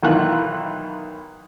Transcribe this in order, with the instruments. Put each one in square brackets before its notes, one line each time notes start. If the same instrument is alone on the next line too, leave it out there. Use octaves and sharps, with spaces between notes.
[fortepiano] B1 D#3 E3 F4 F#6